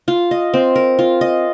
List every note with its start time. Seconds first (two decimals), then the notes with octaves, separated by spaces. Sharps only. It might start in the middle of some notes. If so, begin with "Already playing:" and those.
0.08 F4
0.31 D#5
0.54 C4
0.75 A#4
0.99 F4
1.21 D#5